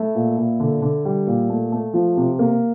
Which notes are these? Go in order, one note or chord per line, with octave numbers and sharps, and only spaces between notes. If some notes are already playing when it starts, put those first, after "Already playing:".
Already playing: A3 E4
A#2
A#2
D3
D3
G3
A#2
A3
A3
F3
C3
A#3